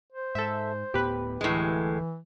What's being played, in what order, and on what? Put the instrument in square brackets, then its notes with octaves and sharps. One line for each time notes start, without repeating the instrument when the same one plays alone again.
[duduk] C5
[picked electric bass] G#2 [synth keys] A4 E5
[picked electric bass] D1 A2 B3 [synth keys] G4 B4
[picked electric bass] D1 [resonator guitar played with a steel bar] A2 G#3 [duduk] E3